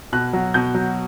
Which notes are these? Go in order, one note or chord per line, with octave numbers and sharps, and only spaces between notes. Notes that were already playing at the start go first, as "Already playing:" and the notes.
B2 F#6
F#3
B2 G6
F#3